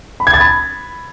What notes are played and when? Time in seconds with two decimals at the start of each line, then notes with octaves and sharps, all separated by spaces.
0.20 B5
0.27 G#6
0.34 A6
0.40 B5